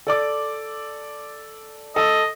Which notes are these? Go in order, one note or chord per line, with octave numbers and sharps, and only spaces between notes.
A4 D5 D6
A4 D#5